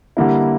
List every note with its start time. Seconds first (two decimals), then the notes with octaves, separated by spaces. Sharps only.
0.17 D3 G3 A#3 E4